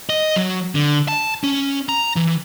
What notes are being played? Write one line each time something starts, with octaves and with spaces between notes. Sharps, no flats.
D#5
F#3
D3
A5
C#4
A#5
E3